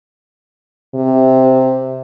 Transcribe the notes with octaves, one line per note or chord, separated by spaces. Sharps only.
C3